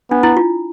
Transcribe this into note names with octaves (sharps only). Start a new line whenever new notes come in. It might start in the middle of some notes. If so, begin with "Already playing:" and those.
B3 D4
E4
F4